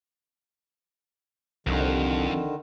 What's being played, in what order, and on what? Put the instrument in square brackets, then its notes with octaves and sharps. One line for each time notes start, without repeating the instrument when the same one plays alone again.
[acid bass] C2 [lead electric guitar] F2 [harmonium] D3 D#3